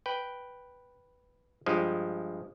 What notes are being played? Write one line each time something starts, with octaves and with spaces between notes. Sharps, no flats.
B4 G5
G2 F3 G#3